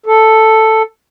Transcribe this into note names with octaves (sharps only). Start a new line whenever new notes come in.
A4